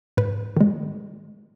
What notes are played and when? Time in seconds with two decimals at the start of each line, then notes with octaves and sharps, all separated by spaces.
0.17 G#2 B4
0.57 D#3 G#3